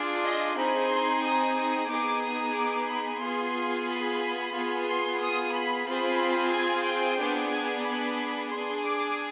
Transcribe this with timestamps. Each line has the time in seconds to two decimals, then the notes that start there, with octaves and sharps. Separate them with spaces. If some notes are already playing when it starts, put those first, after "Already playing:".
Already playing: D4 F4 G#4
0.23 D#5
0.55 C4 D#4 G#4 B5
0.89 C6
1.23 D#6
1.56 D#6
1.88 B3 D#4 G#4 D6
2.21 D#6
2.54 D6
2.88 B5
3.20 B3 F4 G#4 C6
3.87 B5
4.53 B3 F4 G#4
4.87 C6
5.20 D#6
5.52 B5
5.86 C4 F4 G#4 B5
6.52 G#5
6.86 G5
7.18 B3 D4 G#4
7.51 G#5
7.84 B5
8.51 D4 G#4 C6
8.83 D6